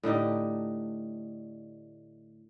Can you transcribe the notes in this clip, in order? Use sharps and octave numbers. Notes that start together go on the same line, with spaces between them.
A2 D3 D#4 G4